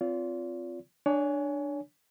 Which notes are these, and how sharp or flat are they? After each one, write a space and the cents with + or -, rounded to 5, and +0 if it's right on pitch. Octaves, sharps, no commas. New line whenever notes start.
C4 -20 F4 +0 D5 -45
D4 +5 C#5 +30 G#5 +0